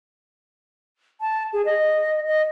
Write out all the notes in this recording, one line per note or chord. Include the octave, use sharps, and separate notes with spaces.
A5
G#4
D#5
D#5